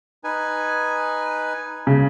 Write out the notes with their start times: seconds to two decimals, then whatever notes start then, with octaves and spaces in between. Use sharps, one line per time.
0.24 D#4 B4 G#5
1.87 C#3